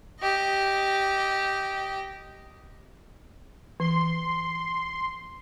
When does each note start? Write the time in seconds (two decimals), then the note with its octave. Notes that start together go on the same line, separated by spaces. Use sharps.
0.20 G4 D#5
3.80 E3 C6